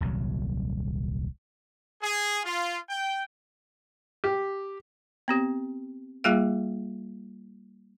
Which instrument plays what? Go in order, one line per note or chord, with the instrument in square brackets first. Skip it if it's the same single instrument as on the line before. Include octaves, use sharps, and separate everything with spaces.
[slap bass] D#1 C2 F#3
[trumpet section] G#4
F4
G5
[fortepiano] G4
[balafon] B3 C4 G4
G3 A#3 F4 G#4 F5